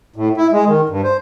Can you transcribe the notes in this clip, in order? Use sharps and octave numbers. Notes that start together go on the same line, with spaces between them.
A2
E4
G#3
D#3
G2
C5